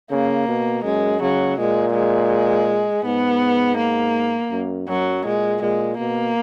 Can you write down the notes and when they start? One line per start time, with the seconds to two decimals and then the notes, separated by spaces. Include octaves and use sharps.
0.11 C#3 A#3
0.48 B2
0.84 F#2 G#3
1.21 C#3 F#3
1.58 A#2 G#3
1.94 G#3
3.05 G#2 B3
3.78 A#3
4.51 F#2
4.88 F#2 F#3
5.25 A#2 G#3
5.62 A#2 G#3
5.98 B2 A#3